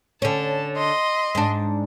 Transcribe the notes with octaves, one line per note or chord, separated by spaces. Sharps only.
D3 C#4 A5
D#5 C6
G#2 D4